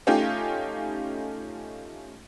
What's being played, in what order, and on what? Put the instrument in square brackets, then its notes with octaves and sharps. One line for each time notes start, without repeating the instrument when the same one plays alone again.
[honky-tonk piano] A3 C#4 D#4 F4 G4